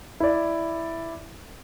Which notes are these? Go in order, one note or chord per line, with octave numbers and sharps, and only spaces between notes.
E4 D5